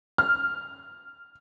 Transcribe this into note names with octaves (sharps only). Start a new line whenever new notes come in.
F6